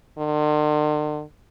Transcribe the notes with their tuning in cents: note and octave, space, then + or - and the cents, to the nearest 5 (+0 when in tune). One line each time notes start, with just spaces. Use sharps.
D3 +45